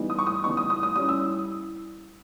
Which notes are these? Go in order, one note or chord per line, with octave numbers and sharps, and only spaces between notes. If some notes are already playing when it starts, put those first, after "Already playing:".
Already playing: E3 G3 B3 D#4
D#6
C#6
D#6
E3 G3 B3 D#4 C#6
D#6
D#6
D#6
G3 C#4 E4 D#6
E6